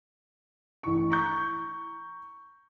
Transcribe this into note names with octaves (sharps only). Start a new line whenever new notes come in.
A1 A2 C#6
A#5 C#6 G6